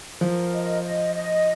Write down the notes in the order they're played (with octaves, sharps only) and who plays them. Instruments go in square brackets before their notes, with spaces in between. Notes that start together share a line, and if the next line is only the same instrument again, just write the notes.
[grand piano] F3 [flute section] A#4
[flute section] D#5
D#5
D#5